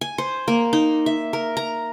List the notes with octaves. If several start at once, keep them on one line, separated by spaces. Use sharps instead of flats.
G#5
C5
A#3
D#4
E5
A#4
A#5